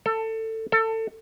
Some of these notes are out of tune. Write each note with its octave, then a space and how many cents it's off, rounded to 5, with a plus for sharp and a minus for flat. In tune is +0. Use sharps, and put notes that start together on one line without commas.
A4 +20
A4 +25